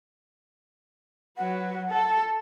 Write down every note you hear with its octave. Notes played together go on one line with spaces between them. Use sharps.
F#3 B4 F#5
A4